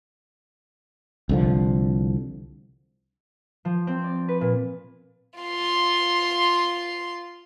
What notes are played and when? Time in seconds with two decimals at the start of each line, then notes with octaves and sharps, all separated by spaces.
1.29 C2 D3 F3
3.65 F3
3.87 C4
4.04 D5
4.28 B4
4.41 A#2
5.40 F4 C6